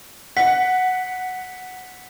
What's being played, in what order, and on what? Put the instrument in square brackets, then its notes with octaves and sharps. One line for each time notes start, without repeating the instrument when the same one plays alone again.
[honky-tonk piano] F#5 [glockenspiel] B6